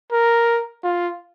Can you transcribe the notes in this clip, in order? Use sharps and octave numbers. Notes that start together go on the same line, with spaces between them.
A#4
F4